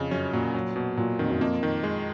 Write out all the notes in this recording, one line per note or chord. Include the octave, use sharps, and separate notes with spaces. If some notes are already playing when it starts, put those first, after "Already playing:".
Already playing: F2 C#3
F#2 C#4
A#2 F#3
F#3
B2
A#2 F#3
F2 D#3
F#2
F2 A#3
D#3
G#3